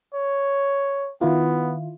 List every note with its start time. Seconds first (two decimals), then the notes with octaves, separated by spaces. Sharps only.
0.14 C#5
1.21 D#3 B3 E4 F4